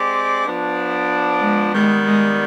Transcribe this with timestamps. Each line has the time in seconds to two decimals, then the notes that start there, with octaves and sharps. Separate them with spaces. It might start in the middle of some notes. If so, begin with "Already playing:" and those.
Already playing: G#3 C4 G4 D5
0.44 F3 B3 D4
1.41 G#3
1.73 D#3 G3 G#3 B3
2.07 G#3